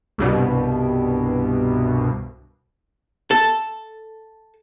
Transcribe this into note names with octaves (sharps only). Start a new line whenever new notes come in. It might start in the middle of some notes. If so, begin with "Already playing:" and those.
C2 G2 B2
A4